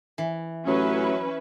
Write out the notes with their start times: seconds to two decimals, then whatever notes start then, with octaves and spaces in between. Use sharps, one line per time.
0.18 E3
0.67 A1 F#3 C#4 B4 E5